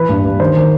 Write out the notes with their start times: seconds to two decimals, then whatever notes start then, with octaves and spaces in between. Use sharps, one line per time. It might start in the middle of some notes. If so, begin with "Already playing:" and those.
Already playing: E3 B4
0.09 G2
0.24 G2
0.40 D#3 C5
0.56 D#3